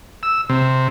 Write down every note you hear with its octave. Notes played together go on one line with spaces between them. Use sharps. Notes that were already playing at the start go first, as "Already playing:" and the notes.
E6
C3